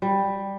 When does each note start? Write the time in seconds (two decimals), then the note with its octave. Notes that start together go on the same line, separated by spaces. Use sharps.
0.02 G3